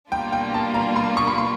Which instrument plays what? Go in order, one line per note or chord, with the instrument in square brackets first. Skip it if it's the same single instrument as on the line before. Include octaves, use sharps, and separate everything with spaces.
[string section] B2 G3 A#3 D4 F4 [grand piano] G5
[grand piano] G5
A5
A#5
C6
C#6
B5
C6